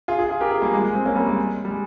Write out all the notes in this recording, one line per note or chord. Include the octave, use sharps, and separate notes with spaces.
F4 G#4
F4 G#4
F4 G#4
G4 A#4
F4 G#4
G3 A#3
G#3
G#3
G#3 C4
A#3 C#4
G3 A#3
G#3
G3
G#3